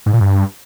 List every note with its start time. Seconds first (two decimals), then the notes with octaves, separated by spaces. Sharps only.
0.06 G#2
0.13 A#2
0.21 G2